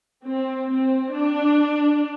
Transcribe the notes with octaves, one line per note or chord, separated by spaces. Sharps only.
C4
C4
D4